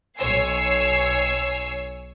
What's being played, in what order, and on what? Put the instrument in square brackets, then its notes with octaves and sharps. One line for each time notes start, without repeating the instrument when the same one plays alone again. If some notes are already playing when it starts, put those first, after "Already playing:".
[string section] B1 C#5 G#5 E6 C7